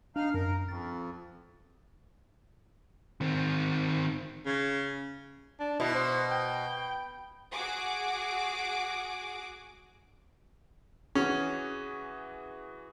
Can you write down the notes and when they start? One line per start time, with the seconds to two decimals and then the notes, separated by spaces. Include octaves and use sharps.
0.16 D4 D#4 F5 F6
0.34 F#2 A#4
0.69 F2 A6
3.21 D#3 C4
4.46 C#3
5.60 D4
5.80 B2 E4
5.95 C5
6.30 G5
7.52 F#4 G#4 D6
11.15 E3 C#4 F#4 G#4